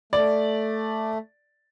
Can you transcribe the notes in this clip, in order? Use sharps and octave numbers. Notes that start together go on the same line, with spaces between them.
A3 D5